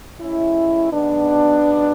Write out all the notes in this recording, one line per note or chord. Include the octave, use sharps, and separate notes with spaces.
A1 A2 G#3 C#4 E4
B1 B2 G#3 B3 D4
B1 B2 G#3